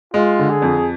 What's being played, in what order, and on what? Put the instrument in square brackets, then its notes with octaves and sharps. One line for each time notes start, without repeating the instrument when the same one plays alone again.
[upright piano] G#3 [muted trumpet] F4
[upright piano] D3
[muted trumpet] G#4
[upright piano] F2